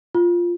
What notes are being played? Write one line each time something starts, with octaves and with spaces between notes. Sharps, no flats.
F4